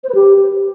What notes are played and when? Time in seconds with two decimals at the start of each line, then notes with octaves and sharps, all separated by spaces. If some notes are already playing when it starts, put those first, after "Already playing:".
0.04 C5
0.09 B4
0.15 G4